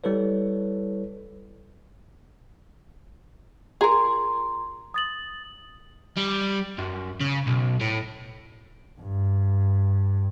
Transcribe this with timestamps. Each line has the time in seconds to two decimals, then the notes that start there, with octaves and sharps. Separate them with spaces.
0.04 G3 E4 A4 B4 C#5
3.81 F4 G#4 A#4 A#5 C6
4.94 D#6 A6 F#7
6.17 G3
6.78 F#2
7.21 C#3
7.47 B1
7.81 A2
9.01 G2